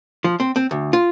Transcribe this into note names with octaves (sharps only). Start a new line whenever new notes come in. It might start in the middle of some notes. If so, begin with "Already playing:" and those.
F3
C4
C4
D2
F4